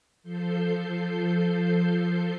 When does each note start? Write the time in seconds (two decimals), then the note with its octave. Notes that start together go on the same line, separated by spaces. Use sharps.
0.23 F3 A4 G6 C7